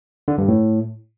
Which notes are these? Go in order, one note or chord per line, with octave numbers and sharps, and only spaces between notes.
D3
G2
A2